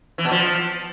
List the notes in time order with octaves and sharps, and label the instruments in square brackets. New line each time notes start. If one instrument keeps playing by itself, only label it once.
[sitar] E3
B2
F3